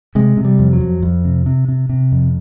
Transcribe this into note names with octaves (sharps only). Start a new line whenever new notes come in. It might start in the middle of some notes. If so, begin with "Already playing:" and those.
C3 G#3
C3
G3
F2
F#3
F2
F2
C3
C3
C3
C3
F2